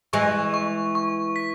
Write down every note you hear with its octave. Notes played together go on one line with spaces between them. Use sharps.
E3 G#3 C#6
C#6
C#6
B6